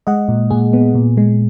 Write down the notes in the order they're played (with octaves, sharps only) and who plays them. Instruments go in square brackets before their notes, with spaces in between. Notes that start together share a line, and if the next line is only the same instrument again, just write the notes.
[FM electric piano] G#3 D#5 F#5
A#2
A#2 G#4
B3
A#2
G#3